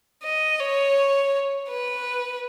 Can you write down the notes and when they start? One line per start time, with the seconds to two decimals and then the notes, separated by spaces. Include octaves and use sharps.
0.23 D#5
0.60 C#5
1.69 B4